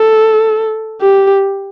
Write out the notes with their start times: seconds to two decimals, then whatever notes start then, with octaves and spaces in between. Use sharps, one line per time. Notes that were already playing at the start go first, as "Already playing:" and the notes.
Already playing: A4
1.01 G4